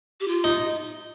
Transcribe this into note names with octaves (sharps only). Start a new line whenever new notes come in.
G4
F4
D#4